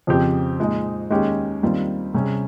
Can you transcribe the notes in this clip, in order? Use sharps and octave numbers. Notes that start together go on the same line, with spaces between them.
F2 C#3 F3 C4 G4
A#2 G#3 D#4 G#4
D#2 D#3 G#3 C#4 G4
D#2 D#3 G3 C4 F4
C3 G3 C#4 G#4